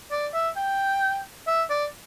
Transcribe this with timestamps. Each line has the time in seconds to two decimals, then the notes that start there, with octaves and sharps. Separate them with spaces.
0.11 D5
0.34 E5
0.56 G5
1.47 E5
1.69 D5